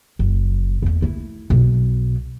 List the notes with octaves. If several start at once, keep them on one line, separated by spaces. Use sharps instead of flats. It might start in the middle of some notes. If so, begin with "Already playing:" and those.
F#1
E2 A3
A3 E4
B1 B2